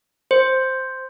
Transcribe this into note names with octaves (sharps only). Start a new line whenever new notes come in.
C5